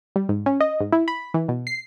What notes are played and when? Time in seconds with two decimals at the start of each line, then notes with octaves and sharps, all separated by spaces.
0.16 G3
0.29 G#2
0.46 C#4
0.60 D#5
0.81 G#2
0.93 E4
1.08 B5
1.34 E3
1.48 B2
1.67 C7